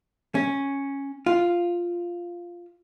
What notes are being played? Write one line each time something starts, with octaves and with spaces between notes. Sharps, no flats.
C#4
F4